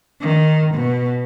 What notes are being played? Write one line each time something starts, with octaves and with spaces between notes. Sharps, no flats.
D#3
B2